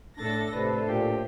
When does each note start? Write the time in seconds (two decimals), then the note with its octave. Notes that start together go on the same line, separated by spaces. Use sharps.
0.16 A2 D4 A4 A6 A#6
0.53 A2 C3 B4 C5
0.88 A#2 G4